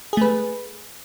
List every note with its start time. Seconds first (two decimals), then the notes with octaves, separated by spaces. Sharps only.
0.13 G#4
0.17 A3
0.21 B4